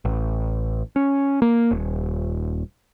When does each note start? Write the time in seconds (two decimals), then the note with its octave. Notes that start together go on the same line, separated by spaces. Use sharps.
0.05 A1
0.96 C#4
1.42 A#3
1.71 D#1